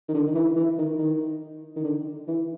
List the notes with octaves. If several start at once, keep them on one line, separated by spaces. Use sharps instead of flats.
D#3
D3
D#3
E3
E3
D#3
D#3
D#3
D3
E3